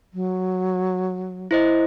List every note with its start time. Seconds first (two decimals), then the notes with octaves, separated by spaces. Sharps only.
0.14 F#3
1.51 E4 C5 D#5